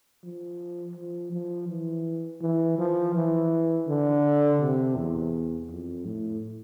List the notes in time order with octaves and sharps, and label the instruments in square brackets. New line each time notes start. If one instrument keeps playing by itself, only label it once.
[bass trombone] F3
F3
F3
E3
E3
F3
E3
D3
C3
E2
F2
A2